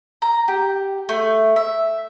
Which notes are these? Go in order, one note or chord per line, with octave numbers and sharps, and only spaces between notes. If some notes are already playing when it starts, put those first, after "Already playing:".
A#5
G4
A3
E5